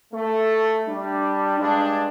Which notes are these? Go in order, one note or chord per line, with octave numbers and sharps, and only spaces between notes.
A3
G3 D4
G2 G#3 D4